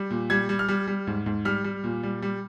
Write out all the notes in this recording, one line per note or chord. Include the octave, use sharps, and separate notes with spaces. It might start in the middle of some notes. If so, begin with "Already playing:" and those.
Already playing: G3
A#2
G3 G#6
G3
F6
G3
G3
G#2
G#2
G3 F6
G3
A#2
G3
G3